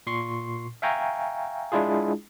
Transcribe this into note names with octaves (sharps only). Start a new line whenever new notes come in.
A#2 C6 C#6 C7
E5 F5 G5 G#5 A#5 C#6
G#3 D4 E4 F4 G#4